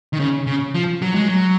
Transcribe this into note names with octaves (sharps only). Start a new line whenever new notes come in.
D#3
C#3
C#3
F3
F#3
G#3
F#3